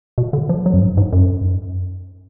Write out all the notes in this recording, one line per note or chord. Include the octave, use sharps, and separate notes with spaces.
B2
D3
F3
F#3
F#2
G#2
G#2
F#2